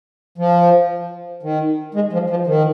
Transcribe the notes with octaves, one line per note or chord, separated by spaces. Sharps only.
F3
D#3
G#3
F3
F3
D#3